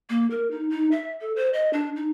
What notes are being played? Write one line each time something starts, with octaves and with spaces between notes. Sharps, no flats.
A#3
A#4
D#4
D#4
E5
A4
C5
D#5
D4
D#4